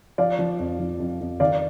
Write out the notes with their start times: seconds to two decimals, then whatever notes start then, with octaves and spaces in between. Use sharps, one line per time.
0.18 F3 D5 F5
0.39 F3
0.59 F2
0.79 F3
1.00 F2
1.21 F2
1.40 D#3 D5 F5